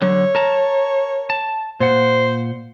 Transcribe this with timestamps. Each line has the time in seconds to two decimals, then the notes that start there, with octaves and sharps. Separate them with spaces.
0.02 D3 F#3 C#5
0.35 A#4 A5 A#5
1.30 A5
1.80 A#2 C5 F#5